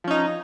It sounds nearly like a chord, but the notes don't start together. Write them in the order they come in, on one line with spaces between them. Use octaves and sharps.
F3 C#4 D#4